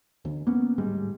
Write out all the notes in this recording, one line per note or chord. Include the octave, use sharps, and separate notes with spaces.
D2
A#3 B3 C#4
D1 G#2 G3 G#3